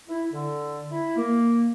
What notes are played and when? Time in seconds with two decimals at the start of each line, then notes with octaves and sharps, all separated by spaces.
0.08 E4
0.32 D3
0.91 E4
1.17 A#3